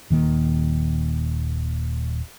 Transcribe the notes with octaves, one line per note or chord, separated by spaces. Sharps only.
D#1 D#3 A#3